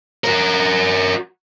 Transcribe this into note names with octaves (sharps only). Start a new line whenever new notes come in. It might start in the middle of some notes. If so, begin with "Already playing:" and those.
F#4 A#4